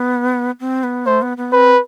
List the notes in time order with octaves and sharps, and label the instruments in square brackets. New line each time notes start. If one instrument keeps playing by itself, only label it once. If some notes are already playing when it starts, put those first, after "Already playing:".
Already playing: [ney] B3
C4
B3
[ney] A3 [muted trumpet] C5
[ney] B3
B3
[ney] C4 [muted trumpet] B4